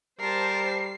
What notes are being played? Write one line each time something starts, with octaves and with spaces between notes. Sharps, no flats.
G3 A#4 C5 A5 C7